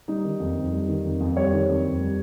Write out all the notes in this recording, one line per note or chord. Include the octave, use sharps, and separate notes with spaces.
G3 D#4
D#3
F2
F2
G3
D#3
F2
F2
G3 C#5
D#3
F2
F2
G3